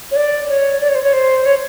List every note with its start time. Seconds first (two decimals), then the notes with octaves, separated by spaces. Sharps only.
0.11 C#5
0.16 D5
0.44 D5
0.48 C#5
0.81 D5
0.88 C#5
0.95 C5
1.02 C#5
1.13 C5
1.45 C#5